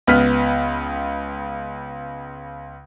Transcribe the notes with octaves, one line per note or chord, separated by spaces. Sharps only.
C#2 B3 F6 B6